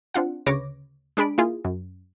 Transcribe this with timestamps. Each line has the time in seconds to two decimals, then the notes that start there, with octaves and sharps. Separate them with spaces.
0.14 C4 D4 F4 F#5
0.46 D2 C#3 B4 C#5 D6 A#6
1.17 G#3 D4 G#4 B5 D7
1.38 A#3 E4 F4 G#4
1.65 F#2